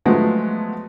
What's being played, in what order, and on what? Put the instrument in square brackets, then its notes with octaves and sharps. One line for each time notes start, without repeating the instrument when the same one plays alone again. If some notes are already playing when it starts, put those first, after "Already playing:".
[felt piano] F3 F#3 G#3 A3 B3